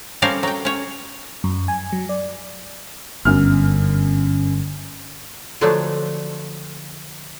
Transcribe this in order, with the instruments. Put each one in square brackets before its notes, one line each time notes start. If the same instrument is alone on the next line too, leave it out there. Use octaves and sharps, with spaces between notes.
[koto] G3 C4 C#4 A4 A#4 F5
F#3 G5
C#4 C#5
[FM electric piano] F#2
G#5
F#3
D5
[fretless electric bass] G1 [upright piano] F#2 F6
[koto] D3 F3 F#3 A3 D4